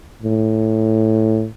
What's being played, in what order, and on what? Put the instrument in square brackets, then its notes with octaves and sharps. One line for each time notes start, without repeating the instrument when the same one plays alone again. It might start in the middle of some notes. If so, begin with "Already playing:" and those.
[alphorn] A2